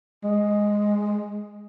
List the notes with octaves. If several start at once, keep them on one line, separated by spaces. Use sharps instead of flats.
G#3